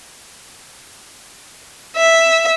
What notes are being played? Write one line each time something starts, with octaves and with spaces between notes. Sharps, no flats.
E5